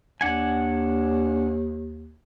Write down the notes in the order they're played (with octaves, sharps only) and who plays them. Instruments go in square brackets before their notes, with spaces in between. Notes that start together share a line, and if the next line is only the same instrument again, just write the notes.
[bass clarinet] D#2 [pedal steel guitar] D4 F#5 G#5